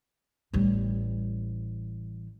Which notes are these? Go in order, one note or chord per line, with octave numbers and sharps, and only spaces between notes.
A1 G3